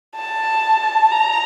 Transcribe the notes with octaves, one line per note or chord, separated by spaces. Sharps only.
A5
A#5